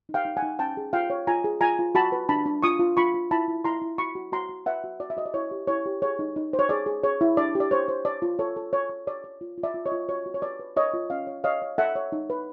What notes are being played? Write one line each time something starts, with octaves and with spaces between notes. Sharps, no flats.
D#4
F5 G5
D#4
F#5 G#5
D#4
C#4 G5 A5
G#4
F4 F5 G5
C#5
F4 G#5 A#5
G#4
F4 G#5 A#5
F4
F#4 A5 B5
B4
D4 A5 B5
D4
F4 C#6 D#6
F4
F4 B5 C#6
F4
E4 A5 B5
E4
E4 A#5 C6
E4
F#4 B5 C#6
F#4
F#4 A#5 C6
F#4
B4 E5 F#5
F#4
F#4 D5
E5
F#4 D#5
D5
E4 C#5
G4
E4 C#5
G4
G#4 C#5
D#4
D#4
C5
C#5
G#4 D5
G#4
G#4 C#5
E4
D4 D5
G4
D5
C5 C#5
C5
C#5 D5
F4
A4 C#5
A4
C#5
C#5
C#5 D5
C#5
F4
F4
D5 E5
F4
C#5 D#5
F4
F#4 C#5
F#4
C#5
B4 D5
B4
A#4 C#5 D#5
F4
C#4 D#5 F5
C#5
C#5 D#5 F5
C#5
A4 E5 F#5
C#5
D#4
B4